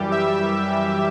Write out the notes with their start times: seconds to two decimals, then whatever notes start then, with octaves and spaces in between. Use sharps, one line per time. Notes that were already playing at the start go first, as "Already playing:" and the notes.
Already playing: F#2 E3 G3 G4
0.12 F#2 E5
0.39 F#2
0.68 E3